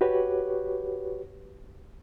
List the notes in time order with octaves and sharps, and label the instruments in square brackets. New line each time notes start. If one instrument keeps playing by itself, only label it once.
[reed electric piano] F#4 G4 B4 C#5